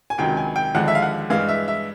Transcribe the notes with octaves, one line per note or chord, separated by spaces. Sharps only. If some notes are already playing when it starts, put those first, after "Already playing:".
G#5
C#2 C3 D#3 F#3 G5
G#5
G5
D#2 D3 F3 G#3 F#5
E5
F5
F#5
G2 E3 G#3 F5
E5
E5